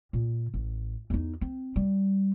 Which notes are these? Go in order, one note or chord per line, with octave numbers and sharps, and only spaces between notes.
A#2
A1
E2 D#4
C4
G3